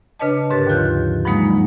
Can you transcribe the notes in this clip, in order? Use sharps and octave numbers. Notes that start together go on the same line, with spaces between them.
C#3 D4 B4 C#5 D#5 A5
G#2 D3 G4 A#4 B4 A6
D#2 D#3 F3 F4 F#6 G6
G2 F3 F#3 G#3 A#3 D#4